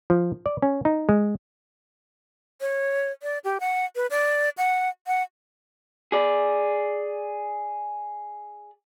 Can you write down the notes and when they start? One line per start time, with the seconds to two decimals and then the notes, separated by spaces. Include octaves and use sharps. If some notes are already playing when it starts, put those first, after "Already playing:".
0.10 F3
0.46 D5
0.62 C#4
0.85 D#4
1.09 G#3
2.61 C#5
3.22 D5
3.44 G4
3.60 F#5
3.96 B4
4.10 D5
4.57 F#5
5.07 F#5
6.12 G#4 D5